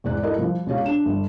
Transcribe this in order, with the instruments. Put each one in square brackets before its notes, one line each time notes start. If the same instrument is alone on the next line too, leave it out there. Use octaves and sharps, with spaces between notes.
[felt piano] E2 G#2 D5 F#6
E4 G4 A4 A#4 D#5
F3 G3
C#2 B2 G4 C#5 F5
D4 E7
G1